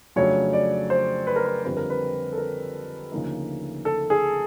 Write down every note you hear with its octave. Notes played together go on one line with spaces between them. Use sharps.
F2 C#3 F#3 A3 D4 C#5
D5
C5
B4
A#4
B4
F2 D3 G3 C4 F4 B4
A#4
B4
A4
A#4
D2 C#3 F3 A#3 D#4
A4
G#4